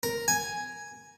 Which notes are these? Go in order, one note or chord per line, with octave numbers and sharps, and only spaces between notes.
A#4
G#5